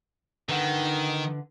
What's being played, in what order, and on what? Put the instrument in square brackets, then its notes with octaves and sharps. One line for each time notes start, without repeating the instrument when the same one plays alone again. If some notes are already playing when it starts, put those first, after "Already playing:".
[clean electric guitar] D3 B4 F#5 [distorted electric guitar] D#3